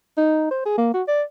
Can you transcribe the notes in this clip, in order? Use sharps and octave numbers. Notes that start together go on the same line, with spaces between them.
D#4
C5
G#4
A#3
F#4
D5